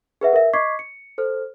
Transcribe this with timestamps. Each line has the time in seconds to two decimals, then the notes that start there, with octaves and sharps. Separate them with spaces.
0.21 G#4 B4 E5 F#5
0.33 A#4 E5
0.53 D#5 C#6 D6 G#6 B6 C7
0.79 C#7
1.18 A4 C5 F6